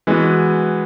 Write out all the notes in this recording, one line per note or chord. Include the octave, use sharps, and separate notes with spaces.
E3 G#3 B3 F#4